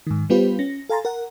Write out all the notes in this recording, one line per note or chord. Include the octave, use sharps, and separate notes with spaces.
G#2 D#3
G3 B3 F4 G4 B4 C5
C#4 A#6
A4 F5 G#5 A#5 C6 A6
A#4 F#5